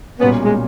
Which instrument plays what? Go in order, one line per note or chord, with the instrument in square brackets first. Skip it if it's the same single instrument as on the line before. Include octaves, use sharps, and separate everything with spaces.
[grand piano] B1 A#2 G3 C#4 [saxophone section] B3
[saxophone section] G#3